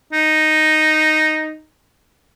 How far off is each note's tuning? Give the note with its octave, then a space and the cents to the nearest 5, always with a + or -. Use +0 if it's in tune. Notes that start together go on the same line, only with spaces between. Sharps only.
D#4 +0